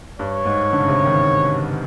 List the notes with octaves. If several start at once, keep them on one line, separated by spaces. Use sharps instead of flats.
G2 C#5
G#2
D3
C#3
C3
D#3